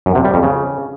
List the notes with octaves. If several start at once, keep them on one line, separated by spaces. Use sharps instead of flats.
F#2
C3
G3
F2
C#3